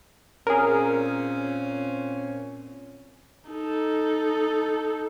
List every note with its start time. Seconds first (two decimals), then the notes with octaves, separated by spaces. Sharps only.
0.47 A#2 C4 C#4 G#4 A#4
3.50 D#4 A4